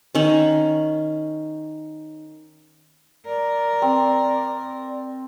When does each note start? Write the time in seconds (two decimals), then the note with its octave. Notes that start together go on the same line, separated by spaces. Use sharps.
0.15 D#3 C#4
3.26 A#4 D5
3.82 C4